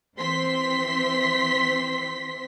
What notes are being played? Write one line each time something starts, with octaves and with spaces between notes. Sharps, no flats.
E3 C4 C6 B6